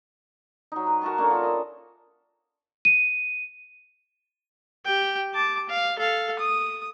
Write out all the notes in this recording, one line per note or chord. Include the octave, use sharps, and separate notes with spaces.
F#3 D#4
B4
F#4 A#4 A5 C#6
A#3 C#4 D4 A4
F4 A4
D#5 E5
D#7
G4 G5
A5 D6
F5
A4 F5
D#6